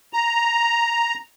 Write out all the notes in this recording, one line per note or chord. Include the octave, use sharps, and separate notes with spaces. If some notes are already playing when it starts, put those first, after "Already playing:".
A#5